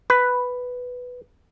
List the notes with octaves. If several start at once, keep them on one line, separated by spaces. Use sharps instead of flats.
B4